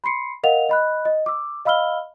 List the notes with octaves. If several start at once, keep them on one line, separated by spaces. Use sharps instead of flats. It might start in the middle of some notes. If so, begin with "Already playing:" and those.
B5 C6 C7 C#7
A#4 D#5 F5 F#5 F7
D#5 B5 F#6
D#5
D6 E6
D#5 F5 B5 E6 F6 G7